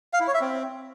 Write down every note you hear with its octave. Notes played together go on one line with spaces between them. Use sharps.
F5
E4
C#5
E5
C4